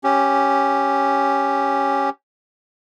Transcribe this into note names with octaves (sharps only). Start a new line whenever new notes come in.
C#4 G4